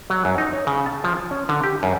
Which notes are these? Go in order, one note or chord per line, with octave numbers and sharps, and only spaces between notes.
F#3
F#2
D#4
C#5
C#3
A5
F3
A5
C#4
D3
G4
F#2